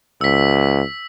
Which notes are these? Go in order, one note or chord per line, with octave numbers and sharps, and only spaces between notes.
C#2 E6 B6